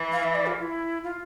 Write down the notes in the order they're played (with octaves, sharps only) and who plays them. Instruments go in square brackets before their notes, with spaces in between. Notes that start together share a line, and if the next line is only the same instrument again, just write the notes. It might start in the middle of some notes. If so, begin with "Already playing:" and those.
Already playing: [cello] E3
[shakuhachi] F5
E5
D5
F4
F4
E4
F4